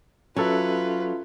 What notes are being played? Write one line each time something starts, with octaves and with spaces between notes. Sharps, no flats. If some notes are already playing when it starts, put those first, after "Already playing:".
F#3 C#4 F4 A4 B4 E5